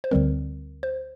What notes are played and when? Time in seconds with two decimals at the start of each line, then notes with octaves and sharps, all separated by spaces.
0.04 C5
0.11 D2 D3 G3 C4 A#4
0.83 C5